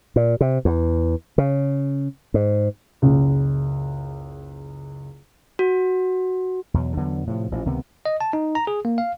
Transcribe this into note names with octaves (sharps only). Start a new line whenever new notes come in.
A#2
C3
E2
C#3
G#2
F#1 C#2
F#4
E2 B2 F#3
E2 D3 F#3 B3
A2 C3 F3
A1 A#2 F3
C#2 C3 D#3 B3
D#5
A5
D#4
A#5
G#4
A#3
F5